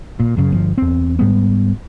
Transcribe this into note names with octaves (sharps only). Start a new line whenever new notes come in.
A#2
F#2 C#3
G1 F3
E2 C4
G#2 G3 B3